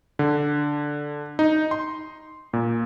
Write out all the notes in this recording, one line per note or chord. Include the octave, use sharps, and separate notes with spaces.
D3
D#4
C6
A#2